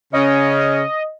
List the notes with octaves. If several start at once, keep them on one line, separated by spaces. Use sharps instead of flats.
C#3 C#4 D#5